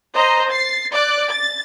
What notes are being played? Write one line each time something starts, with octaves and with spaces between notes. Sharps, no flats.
C5 D#5 A#5
A6 C7
D5 D6 F#6
A6